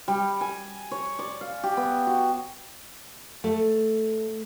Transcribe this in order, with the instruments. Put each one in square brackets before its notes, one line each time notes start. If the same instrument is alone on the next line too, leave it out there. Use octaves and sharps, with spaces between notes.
[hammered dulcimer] G3
G#5
C#5
D5
F5
G4
B3
F#4
[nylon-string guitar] A3